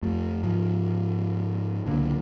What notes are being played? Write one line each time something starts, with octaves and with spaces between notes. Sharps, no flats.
F2 A3
G#2 F3
C#2 A#2 D3